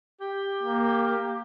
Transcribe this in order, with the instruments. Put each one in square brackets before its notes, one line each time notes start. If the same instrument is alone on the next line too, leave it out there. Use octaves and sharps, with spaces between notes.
[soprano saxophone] G4
[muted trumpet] A#3